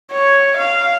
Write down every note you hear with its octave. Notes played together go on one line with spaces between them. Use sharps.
C#5
F5